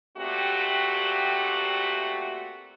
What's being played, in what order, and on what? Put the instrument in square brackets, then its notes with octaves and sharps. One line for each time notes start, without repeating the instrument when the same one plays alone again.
[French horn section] A#2 A3 C4 F#4 G4